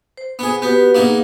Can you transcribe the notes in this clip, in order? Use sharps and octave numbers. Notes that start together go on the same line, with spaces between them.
C5
B3 G#4
B3 F#4 G4 B4
A#3 B3 D#4 G#4 F#5